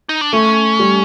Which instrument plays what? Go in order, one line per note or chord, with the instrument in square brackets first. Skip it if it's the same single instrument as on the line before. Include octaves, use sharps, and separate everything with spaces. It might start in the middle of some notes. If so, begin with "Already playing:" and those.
[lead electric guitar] D#4
D4
[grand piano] A3 [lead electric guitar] C#4
[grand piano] G3